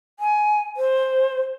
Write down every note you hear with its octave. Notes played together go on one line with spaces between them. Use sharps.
G#5
C5